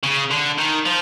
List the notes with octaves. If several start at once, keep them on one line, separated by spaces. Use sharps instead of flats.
C#3
D3
D#3
F3